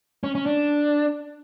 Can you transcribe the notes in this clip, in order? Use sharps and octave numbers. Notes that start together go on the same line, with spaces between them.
C#4
C#4
D4